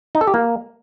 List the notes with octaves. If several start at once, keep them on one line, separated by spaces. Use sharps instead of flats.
D#4
A4
G4
A#3